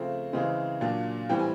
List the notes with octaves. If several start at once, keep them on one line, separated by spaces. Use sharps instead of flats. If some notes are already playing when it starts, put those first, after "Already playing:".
Already playing: C#3 F3 A3 C4
C#3 E3 G#3 C4
A#2 F#3 A#3 D4
A2 E3 G3 C4 G5
G#5